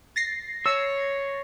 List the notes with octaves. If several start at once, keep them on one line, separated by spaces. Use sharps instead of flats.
A6 A#6 C7
C#5 E6